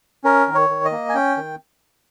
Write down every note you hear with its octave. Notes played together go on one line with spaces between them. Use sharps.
C#4 A#4
D#3
C#5
D#3
D#5
A#3
G#5
C#4 G5
D#3